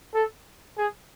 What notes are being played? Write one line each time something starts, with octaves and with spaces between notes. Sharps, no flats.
A4
G#4